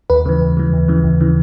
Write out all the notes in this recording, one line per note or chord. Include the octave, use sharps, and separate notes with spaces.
D#2 B4
C#3 E3
D#2
C#3 E3
D#2
C#3 E3
D#2
C#3 E3